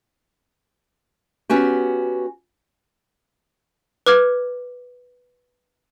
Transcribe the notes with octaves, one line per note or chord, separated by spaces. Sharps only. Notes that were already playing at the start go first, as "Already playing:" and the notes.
B3 C#4 F#4 G4
B4 D6 F6 G#6